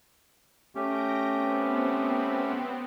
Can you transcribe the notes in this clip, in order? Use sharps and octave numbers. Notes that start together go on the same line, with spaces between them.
A3 C#4 G4 G6 A#6 D7
B3 C4